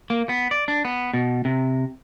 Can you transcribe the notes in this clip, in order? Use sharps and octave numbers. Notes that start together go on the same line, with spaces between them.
A#3
B3
D5
D4
B3
B2
C3